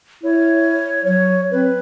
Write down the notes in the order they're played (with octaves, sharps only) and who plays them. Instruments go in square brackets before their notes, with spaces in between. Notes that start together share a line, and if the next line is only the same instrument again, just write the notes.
[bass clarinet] E4 [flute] C#5
[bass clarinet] F#3 [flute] C#5
[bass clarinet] C4 [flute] B4